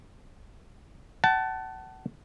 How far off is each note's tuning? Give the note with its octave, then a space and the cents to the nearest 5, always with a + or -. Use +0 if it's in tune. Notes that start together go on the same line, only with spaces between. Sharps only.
F#5 +35 A5 +0